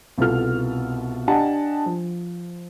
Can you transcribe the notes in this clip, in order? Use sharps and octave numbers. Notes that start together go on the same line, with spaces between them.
C2 B2 B3 F4 A4 F6
D4 G4 D#5 F#5 G#5 A5
F3